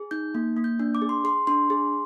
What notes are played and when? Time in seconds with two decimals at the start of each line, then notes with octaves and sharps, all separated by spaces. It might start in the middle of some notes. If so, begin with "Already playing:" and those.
Already playing: G#4
0.11 D#4 G6
0.35 A#3
0.57 A#3
0.64 G6
0.80 D4
0.95 D6
1.02 G#4
1.09 C6
1.24 G#4 C6
1.47 D4 C6
1.70 G#4